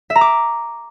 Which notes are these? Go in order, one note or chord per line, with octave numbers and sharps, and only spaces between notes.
E5
A#5
D6